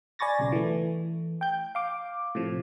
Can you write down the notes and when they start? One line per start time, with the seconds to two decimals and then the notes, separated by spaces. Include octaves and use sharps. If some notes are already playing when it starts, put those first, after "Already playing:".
0.19 D5 G#5 B5 C#6 A6 A#6
0.39 B1 C#3
0.52 E3 A3
1.41 G5 G6
1.75 F5 D6
2.35 A2 C3 F3